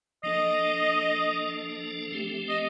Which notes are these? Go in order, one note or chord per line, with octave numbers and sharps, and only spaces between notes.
F3 A#3 D4 A4 D#5
F3 A3 C4 G4
D#5